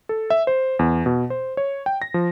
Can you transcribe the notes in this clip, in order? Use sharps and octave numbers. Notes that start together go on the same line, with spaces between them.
A4
E5
C5
E2
B2
C5
C#5
G5
A#6
F3